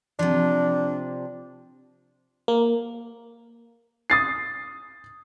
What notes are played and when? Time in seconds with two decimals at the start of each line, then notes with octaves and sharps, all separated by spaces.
0.19 C3 F3 D4
2.48 A#3
4.10 D#6 A6 C7